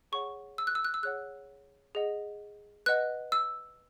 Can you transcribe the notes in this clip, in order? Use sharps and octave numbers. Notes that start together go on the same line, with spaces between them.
G#4 C#5 F#5 C#6
E6
F#6
E6
F#6
E6
G#4 C#5 F#5 F#6
G#4 D#5 F#5
B4 D#5 F#5 F#6
E6